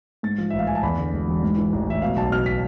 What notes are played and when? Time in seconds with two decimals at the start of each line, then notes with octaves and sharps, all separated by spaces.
0.23 G#2 A6
0.38 F3
0.50 A1 E5
0.59 F5
0.67 A1 G#5
0.75 A5
0.83 E2 B5
0.98 D3
1.13 E1
1.27 E1
1.43 G#2
1.58 E3
1.72 A1
1.87 A1 E5
2.02 B2 F5
2.17 B1 A5
2.32 B2 F6
2.46 B6